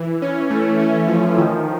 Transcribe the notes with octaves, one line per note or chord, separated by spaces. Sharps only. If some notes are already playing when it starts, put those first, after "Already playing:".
Already playing: E3
C#4
A3
C#4
F3
D#3